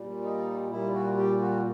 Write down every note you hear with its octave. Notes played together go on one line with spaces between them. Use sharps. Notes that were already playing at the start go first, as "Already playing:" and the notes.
Already playing: A#2 G3
D#4
A#2 G3 E4
F#4
G4
F#4